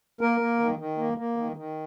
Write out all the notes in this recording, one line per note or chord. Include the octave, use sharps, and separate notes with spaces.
A#3 A#4
A#3
D#3
D#3
A#3
A#3
D#3
D#3